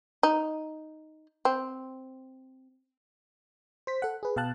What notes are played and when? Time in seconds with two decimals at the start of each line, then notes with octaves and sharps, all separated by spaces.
0.23 D#4
1.45 C4
3.87 C5 B6
4.02 A4 F#5
4.23 G#4 B4
4.36 B2 F5 G5 A5 F#6